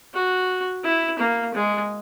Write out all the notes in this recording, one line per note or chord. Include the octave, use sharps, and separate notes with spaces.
F#4
E4
A#3
G#3